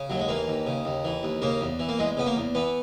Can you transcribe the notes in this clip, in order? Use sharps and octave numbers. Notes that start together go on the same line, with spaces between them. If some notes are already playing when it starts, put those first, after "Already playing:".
Already playing: C#3
D#2 F#3
G#3
E3 A#3
D#2
C#3
D#2
E3
D#2
C#3 A#3
E2
E3
A#3
E2 G#3
C#3 B3
A#3
E2
E3 B3